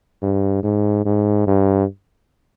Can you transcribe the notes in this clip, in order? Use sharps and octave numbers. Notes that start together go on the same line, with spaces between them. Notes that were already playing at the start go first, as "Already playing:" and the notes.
G2
G#2
G#2
G2